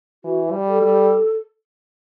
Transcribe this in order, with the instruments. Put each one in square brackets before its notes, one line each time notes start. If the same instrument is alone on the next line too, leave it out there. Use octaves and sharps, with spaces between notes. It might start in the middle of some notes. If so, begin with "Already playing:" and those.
[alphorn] E3 [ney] F#4
[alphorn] G3
[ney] A4
[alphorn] G3